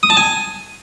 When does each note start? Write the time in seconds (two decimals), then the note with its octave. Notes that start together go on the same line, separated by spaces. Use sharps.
0.03 D#6
0.10 A5
0.17 G#5